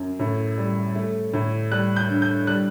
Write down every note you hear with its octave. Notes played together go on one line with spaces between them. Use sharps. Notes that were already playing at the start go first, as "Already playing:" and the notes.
Already playing: F#2
A2
G3
A3
A2
G3 F#6
G6
G2
G6
G3 F#6